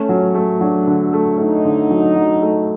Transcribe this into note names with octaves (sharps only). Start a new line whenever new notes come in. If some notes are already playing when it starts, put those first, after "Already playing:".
Already playing: A3 C#4
F#3
A3
F#3 D4
D3
A3
A3 D#4
D3
F#3
F#3
A3